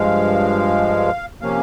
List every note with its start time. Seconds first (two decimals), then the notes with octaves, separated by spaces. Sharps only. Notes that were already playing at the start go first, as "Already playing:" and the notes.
Already playing: G2 F3 G#3 F5
1.42 C3 F3 A#3 C#4 F5